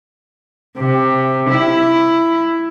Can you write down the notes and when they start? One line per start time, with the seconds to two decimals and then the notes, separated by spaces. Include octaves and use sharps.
0.78 C3
1.50 E4